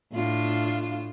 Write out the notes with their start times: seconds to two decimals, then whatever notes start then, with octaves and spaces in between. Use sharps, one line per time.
0.13 A2 D4 F4